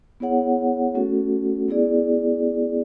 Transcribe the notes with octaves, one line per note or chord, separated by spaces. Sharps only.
B3 E4 G#4 C#5 F#5
A3 C#4 F#4 A4
B3 E4 G#4 D5